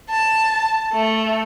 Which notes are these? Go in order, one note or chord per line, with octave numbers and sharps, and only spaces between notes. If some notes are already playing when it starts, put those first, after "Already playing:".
A5
A3